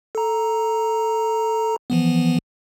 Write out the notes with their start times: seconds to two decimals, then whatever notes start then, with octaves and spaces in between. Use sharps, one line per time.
0.15 A4 A#5
1.90 E3 F3 B3